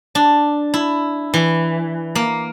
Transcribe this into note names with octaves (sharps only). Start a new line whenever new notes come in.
D4
E4
E3
A#3